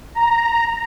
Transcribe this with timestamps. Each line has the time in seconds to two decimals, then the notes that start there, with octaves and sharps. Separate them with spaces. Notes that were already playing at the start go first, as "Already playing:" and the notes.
0.15 A#5